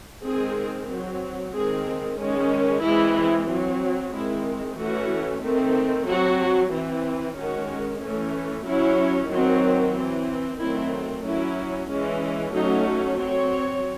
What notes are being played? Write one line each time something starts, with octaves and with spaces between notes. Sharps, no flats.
D#3 G#3 C4 G#4
F#3 C4
D#3 G#3 C4 G#4
D#3 G#3 C#4
E3 G#3 C4 E4
F#3 C4
D#3 G#3 C4 E4
E3 A3 C#4 F#4
D#3 A3 C4
F#3 C4 F#4
E3 C4
D#3 G#3 C#4 F#4
E3 A3 C#4
F#3 C#4 E4
D#3 F#3 C4
E3 C4
D#3 F#3 A3 C4 E4
F#3 C#4 E4
E3 G#3 C#4
F#3 A3 C#4 D#4
F#3 C4 C#5